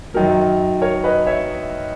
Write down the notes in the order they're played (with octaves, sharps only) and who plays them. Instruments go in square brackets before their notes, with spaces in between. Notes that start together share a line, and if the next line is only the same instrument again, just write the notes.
[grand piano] F#2 D#3 F#3 A#4
A#4 C#5
B4 D#5
C#5 E5